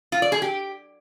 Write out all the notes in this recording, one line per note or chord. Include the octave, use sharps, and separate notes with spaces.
F4
D5
G#4
G4